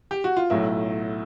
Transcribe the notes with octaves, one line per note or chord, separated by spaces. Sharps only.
G4
F#4
F4
B1 A2 F#3 A3 E4